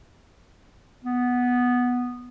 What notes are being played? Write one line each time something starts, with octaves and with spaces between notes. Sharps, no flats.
B3